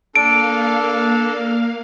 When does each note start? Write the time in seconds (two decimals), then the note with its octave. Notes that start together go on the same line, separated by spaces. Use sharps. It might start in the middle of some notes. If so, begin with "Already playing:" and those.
0.15 A#3 D4 A4 F5 D7